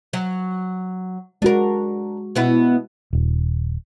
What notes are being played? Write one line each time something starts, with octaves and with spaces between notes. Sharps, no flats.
F#3
G#3 D4 F#4 A#4
B2 B3 E4
D#1